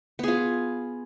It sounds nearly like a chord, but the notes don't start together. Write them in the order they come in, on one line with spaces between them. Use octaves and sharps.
B3 G#4 F4